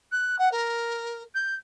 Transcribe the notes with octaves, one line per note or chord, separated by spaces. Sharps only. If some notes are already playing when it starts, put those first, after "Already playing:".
F#6
F#5
A#4
G6